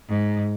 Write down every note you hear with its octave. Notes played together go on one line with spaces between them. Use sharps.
G#2